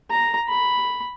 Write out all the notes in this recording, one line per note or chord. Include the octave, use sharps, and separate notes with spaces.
A#5
B5